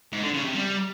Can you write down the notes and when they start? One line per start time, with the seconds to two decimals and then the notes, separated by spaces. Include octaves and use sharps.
0.13 G#2
0.23 D3
0.34 C#3
0.45 C3
0.55 G3